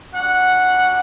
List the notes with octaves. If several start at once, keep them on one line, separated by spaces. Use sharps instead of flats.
G3 D4 F#4 F#5